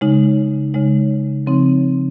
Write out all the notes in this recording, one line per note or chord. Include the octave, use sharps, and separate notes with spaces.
C#3 G#3 D#4
C#3 G#3 D#4
C#3 F3 C4 D#4